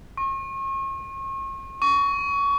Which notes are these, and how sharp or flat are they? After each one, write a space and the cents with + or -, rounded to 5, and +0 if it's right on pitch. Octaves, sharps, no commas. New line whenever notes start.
C#6 -40
C#6 +25